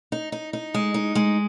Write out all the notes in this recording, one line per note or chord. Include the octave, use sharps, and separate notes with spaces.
D#4
D#4
D#4
G#3
D#4
G#3